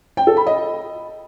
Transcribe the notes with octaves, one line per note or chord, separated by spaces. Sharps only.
G5
A4
B5
D#5